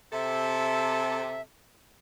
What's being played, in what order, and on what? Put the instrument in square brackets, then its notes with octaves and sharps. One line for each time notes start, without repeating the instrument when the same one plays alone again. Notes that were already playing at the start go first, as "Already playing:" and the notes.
[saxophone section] C3 A4 [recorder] E5